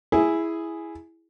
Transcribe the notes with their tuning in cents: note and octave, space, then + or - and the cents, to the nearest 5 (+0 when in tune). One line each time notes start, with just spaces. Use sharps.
E4 +0 G#4 +0